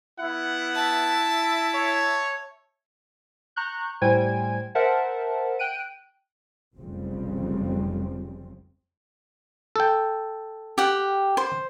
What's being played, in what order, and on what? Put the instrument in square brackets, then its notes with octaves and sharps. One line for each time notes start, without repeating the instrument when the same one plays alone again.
[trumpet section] B3 F#5 [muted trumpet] E4
[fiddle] E5 A5
[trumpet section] C#5
[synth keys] A#5 C#6 F#6 G6
A2 G3 C5 G5 G#5 G#6
A#4 C5 E5 F#5 A5
G5 F#6 D7 D#7
[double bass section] F1 B1 F2 C#3 G3 C4
[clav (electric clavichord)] A4 G5
[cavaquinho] G4 F#5
C5